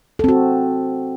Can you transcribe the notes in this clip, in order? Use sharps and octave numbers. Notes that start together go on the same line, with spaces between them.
C4 F#4 A4